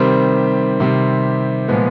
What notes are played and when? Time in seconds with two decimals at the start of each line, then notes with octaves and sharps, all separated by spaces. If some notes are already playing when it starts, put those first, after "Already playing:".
Already playing: C3 D#3 G3 C4
0.80 C3 D#3 G3 C4
1.68 A#2 F3 G#3 B3